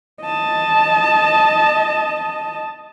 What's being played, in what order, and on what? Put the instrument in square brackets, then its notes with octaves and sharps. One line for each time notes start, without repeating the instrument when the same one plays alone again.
[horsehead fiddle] D#5 A5